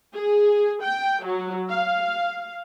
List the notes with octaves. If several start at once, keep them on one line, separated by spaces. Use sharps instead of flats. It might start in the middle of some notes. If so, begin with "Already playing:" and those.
G#4
G5
F#3
F5